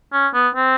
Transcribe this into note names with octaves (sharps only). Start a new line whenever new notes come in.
C#4
B3
C4